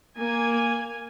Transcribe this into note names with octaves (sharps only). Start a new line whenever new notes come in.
A#3 G#5